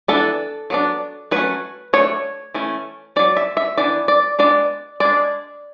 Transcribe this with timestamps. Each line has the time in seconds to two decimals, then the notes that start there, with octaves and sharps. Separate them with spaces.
0.08 E3 B3 D4 A4
0.70 F#3 B3 D4
1.31 F#3 A3 C#4 B4
1.93 F#3 A3 D4 C#5
2.54 E3 A3 C#4
3.16 F#3 C#4 D5
3.37 E5
3.57 E5
3.78 E3 B3 D4 D5
4.08 D5
4.39 G#3 B3 D4 D5
5.00 G#3 D4 D5